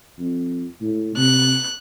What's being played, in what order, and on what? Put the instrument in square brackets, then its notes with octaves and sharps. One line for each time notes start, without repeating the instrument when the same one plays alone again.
[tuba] F2
A2
[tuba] C3 [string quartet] F#6